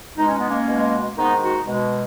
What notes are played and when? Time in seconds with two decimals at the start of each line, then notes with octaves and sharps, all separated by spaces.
0.18 B2 G#3 D#4
0.28 C#4
0.38 B3
0.49 A#3 C#4
0.68 B2 G#3
1.17 G#2 D#3 G#3 B3 D#4
1.42 D#4 F#4
1.67 B2 G#3